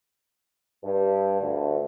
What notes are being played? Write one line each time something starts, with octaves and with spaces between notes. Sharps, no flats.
G2
D2